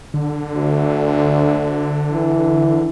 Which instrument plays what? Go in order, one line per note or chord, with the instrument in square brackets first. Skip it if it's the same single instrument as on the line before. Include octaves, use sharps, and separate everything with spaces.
[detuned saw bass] D3
[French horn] D2
E3